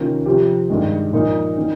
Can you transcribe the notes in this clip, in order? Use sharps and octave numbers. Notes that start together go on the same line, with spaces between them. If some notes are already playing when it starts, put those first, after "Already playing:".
Already playing: C3 D#3 A#3 C#4 F4
C3 F3 C4 G4
G2 D#3 G#3
A#2 F3 A#3 D#4
D#3 A#3 D#4 A#4